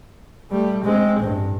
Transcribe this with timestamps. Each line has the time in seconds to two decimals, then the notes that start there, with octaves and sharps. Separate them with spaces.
0.51 G3 A3
0.84 G#3 C4
1.20 A1 G2